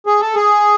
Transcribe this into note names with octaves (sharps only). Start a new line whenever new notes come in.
G#4
A4
G#4